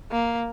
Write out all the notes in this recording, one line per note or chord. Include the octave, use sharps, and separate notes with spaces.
A#3